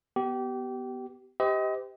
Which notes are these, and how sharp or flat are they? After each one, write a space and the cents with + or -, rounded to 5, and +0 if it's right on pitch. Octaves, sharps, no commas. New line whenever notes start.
B3 +0 G4 -25
G4 +0 C5 -40 D#5 +30